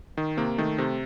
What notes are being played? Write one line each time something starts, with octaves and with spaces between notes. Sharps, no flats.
D#3
C3 A#3
D#3 A3
C3